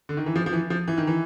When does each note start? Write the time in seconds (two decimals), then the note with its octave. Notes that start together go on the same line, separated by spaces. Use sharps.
0.09 D3
0.17 D#3
0.26 E3
0.36 F3
0.46 F3
0.53 E3
0.70 F3
0.88 E3
0.98 D#3
1.07 E3